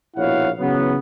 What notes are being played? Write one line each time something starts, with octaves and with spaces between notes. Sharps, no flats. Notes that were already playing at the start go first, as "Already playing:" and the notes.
A#1 B2 E4 C#5 F5 F#5
C#3 E3 F#3 B3